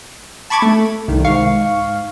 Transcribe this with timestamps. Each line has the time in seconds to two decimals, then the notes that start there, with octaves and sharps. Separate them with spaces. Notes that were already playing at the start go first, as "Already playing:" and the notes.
0.50 A5 B5 C#6 D6 G#6
0.62 A3
1.08 C2 D#3
1.25 G#2 F5 C#6